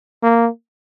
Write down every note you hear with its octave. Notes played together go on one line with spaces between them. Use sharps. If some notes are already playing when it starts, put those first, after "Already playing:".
A#3